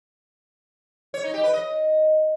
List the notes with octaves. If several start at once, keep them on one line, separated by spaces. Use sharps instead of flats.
C#5
D#4
G4
B4
D#5